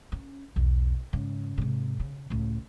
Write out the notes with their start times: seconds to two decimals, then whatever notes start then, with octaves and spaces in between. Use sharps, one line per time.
0.12 C#4
0.56 B1 E2
1.13 G#2 C#3
1.58 G#2 C3
2.00 C#3
2.30 C#2 A2